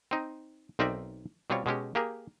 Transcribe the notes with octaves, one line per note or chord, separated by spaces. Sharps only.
C4 D#4
B1 C4 D#4 A#4 D5 E5
B2 G3 C4 F4 C#5
B2 G#3 C#4 G4
A#3 G4 G#4 A#4